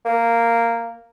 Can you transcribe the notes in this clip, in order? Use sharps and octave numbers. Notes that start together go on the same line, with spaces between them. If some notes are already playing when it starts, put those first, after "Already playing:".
A#3